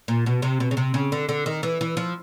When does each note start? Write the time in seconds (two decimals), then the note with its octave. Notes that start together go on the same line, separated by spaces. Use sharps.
0.08 A#2
0.26 B2
0.42 C3
0.60 B2
0.71 C#3
0.77 C3
0.94 C#3
1.12 D3
1.29 D3
1.46 D#3
1.63 E3
1.81 E3
1.97 F3